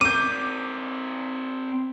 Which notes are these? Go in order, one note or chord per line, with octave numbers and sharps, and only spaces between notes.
C4 A#4 D6 G6 D#7